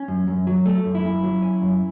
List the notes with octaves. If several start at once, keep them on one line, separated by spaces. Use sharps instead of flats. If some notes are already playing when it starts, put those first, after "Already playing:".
Already playing: C#4
F#2
F#2
F#3
A3
F#2
E4
F#2
F#3
C#4
F#2